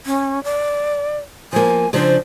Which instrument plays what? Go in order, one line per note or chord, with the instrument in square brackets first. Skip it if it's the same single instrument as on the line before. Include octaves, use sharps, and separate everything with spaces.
[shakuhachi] C#4
D5
[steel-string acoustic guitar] F3 A#3 [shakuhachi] G#5
[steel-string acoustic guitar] C#3 F3 D4 [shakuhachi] C5